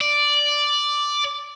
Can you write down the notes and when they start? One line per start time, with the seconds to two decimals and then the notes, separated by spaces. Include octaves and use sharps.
0.01 D5